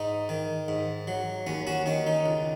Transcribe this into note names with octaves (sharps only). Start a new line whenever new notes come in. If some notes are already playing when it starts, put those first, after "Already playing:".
Already playing: G#2 D#4
D#3
G#2
F#3
D#2 C#4
C#4 F#4
D#3 C#4
D#4
C#2